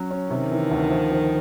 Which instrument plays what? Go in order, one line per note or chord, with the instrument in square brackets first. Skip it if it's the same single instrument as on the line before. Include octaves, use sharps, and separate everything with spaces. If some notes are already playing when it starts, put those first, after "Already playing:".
Already playing: [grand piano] F#3 C#4
C#4
[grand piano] C3 [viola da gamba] D#3
[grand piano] E3
D2
F3
F3